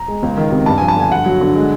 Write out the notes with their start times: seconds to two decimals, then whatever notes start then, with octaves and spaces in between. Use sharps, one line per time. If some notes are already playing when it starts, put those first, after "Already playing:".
Already playing: A#5
0.08 G#3
0.23 C#2
0.37 D#3
0.51 C3
0.66 G2 A5
0.78 G#5
0.82 F3
0.88 A5
0.97 D3 G#5
1.11 G2 F#5
1.26 F#3
1.41 D3
1.55 G#3